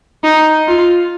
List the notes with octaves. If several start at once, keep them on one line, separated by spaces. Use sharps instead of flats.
D#4
F4